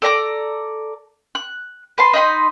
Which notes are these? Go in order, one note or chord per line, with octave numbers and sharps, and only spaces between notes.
A4 D5 A#5 D6
F#6
B4 A5 C6
D#4 D#5 B5 C6